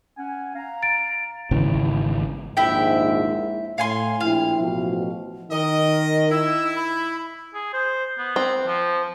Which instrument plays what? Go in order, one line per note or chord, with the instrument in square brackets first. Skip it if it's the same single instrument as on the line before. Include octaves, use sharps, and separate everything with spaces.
[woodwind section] C#4 F#5 G#5
F5 A#5
[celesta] A6 D7
[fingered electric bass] G#1 C#3 E3
[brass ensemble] A#1 D#2 G#2 [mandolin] E4 E5 G5
[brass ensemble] A2 [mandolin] F5 G#5 C6
[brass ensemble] A#1 E4 G5 [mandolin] F5
[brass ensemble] A1 B2 F3
[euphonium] D#3 [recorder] A#4 [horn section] D#5
[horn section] E4 [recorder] E6
[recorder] B5
[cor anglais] G#4
C5
B3
[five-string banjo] C4
[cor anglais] F3